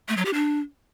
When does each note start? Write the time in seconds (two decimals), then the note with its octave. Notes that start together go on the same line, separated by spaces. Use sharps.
0.09 A3
0.17 F#3
0.25 G4
0.34 D4